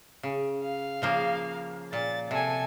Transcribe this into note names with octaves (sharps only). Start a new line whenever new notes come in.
C#3
F5
C#3 F3 A#3
A#2 A6
C3 A4 G#5